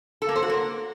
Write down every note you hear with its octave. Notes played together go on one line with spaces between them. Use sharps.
A4
A#3
C5
F#4
A#3